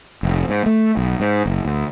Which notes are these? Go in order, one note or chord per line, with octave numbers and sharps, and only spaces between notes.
F1
G#2
A3
B1
G#2
F#1
D2